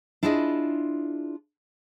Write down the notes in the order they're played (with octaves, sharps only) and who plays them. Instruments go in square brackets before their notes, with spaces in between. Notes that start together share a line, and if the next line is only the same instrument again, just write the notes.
[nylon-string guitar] D4 E4 F4 G#4 D5 D#5